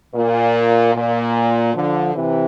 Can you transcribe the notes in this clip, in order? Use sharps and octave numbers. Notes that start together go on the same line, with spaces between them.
A#2
A#2
D3 F3
C3 E3